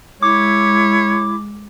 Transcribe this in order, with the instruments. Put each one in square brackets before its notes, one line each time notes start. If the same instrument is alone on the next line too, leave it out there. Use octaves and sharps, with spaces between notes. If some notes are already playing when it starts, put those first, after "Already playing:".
[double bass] G#3 [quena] E4 [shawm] C#5 [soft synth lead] D6